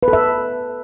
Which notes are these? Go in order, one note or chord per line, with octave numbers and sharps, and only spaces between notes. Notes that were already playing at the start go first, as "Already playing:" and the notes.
B4
A4
E5